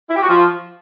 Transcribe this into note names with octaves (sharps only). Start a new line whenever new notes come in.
E4
G4
F#4
F3